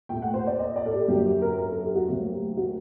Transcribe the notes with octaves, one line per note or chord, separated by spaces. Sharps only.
A#2 A3 G5
F#5
C5
D5
D#5
D5
A4
G4
F#2 D3 F#3 A#3 G4
G4
A#4
A#4
A4
G4
F#4
D2 C3 F#3 A#3 G4
G4
F#4